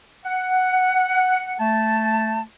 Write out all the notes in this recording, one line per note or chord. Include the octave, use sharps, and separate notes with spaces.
F#5
A3 A5